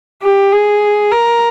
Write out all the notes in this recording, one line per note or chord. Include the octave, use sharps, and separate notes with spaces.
G4
G#4
A#4